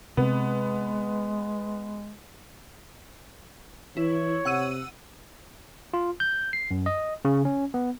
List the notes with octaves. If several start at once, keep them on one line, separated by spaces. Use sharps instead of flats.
C3 G#3 B3 C4
E3 E4 C#5
C3 F#5 E6 D#7
F4
G6
C7
F#2
D#5
C#3
C#4
B3